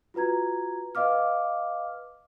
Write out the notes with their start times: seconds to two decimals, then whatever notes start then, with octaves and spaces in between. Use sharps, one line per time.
0.14 F4 F#4 B4 A#5 G#6
0.95 B4 D#5 F5 D6 F6